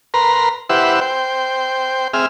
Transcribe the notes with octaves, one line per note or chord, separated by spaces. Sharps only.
A#4 B4 A#5 C6
E4 G4 B4 C5 E5 F#5
C5 G5
C4 G#4 E5 F6